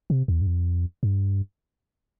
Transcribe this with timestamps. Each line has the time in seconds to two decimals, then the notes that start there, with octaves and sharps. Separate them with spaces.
0.10 C3
0.28 E2
0.41 G2
0.47 F2
1.03 G2